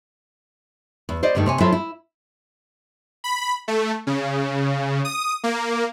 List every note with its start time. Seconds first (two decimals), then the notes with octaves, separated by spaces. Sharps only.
1.09 E2
1.23 C5 D5 D#5
1.35 G2 D3 D#3 G3 A3
1.46 C3 C#5 G#5
1.60 F#3 E4 F4 A4 C5 E5
1.72 E4
3.24 B5
3.68 A3
4.07 C#3
5.05 D#6
5.44 A#3